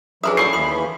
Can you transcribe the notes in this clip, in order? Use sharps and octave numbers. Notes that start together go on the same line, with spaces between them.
E3 F#3 D4 G#4 A#4 E5 C6 D#6
A3 E4 D5 C#6 C7
D#2 E3 B5 C6 D#6